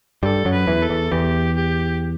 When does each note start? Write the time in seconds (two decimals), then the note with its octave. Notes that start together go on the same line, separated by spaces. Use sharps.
0.23 G2 G3 A4
0.45 F#2 F#3
0.53 B4
0.67 E2 E3
0.82 A4
0.90 E2 E3
1.11 E2 E3 G4
1.56 G4